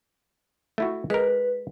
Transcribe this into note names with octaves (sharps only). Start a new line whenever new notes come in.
A3 E4 F#4
G#3 A#4 B4